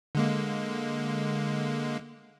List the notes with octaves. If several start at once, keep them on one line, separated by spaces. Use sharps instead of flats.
D3 G#3 A#3